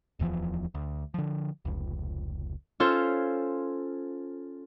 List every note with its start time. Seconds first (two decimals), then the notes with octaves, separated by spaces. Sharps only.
0.19 D1 E2 E3 F3
0.74 D2
1.14 D3 F3
1.65 F1 C#2
2.80 C#4 F4 A4 C5